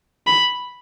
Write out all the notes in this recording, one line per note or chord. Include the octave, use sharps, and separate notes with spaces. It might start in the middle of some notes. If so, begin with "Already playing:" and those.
B5